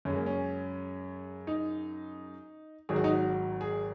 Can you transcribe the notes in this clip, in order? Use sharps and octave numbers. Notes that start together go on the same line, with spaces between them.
F#2 C#3 G#3 C#4
A#3
C#4
D#4
G#1 G#2 D#3 F#3 G#4
F#4
D#4
F#4
G#4